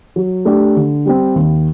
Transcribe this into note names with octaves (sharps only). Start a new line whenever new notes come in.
F#3
A3 D4 G4
D3
G3 C4
D#2